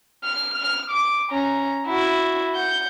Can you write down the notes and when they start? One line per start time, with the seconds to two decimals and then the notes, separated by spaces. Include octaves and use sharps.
0.24 F6
0.58 F6
0.91 D6
1.30 C#4 A#5
1.87 E4 F#4
2.54 F#5 G6